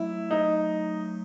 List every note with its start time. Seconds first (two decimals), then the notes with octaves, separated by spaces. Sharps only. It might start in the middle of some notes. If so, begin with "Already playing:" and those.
Already playing: F#3 A3 E4
0.31 D#4